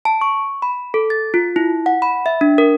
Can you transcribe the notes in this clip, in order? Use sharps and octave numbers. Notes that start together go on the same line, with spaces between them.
A5
C#6
B5
A4
A6
F4
E4
F#5
B5
E5
D4
A#4